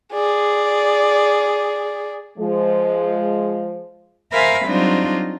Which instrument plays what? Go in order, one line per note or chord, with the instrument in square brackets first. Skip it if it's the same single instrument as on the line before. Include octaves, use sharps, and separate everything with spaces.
[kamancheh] G#4 D5
[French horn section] F3 G#3
[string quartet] A#4 C5 E5 F5 G#5 B5
F#3 G3 C4 D4 D#4 F4